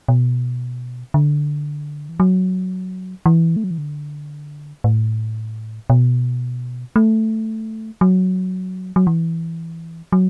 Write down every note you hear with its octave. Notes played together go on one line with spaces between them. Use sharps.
B2
D3
E3
F#3
E3
A3
F#3
E3
D3
A2
B2
A3
F#3
F#3
E3
F#3